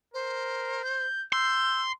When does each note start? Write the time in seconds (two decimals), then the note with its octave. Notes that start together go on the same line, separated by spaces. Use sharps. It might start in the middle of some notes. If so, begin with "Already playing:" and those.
0.14 A#4 C5
0.84 G6
1.33 C6 E6 G6